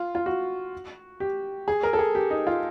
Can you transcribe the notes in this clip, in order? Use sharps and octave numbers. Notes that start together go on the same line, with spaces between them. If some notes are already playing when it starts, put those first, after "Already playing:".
Already playing: F4
F4
F#4
G4
G#4
A#4
A4
G#4
G4
D#4
F4